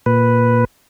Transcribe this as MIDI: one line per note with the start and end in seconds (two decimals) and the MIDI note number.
0.06 0.65 46
0.06 0.65 71